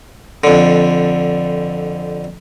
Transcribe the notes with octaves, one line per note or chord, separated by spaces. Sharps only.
F2 D3